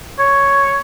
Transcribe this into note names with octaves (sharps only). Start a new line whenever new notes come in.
C#5